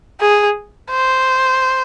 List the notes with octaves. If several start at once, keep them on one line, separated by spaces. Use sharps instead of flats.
G#4
C5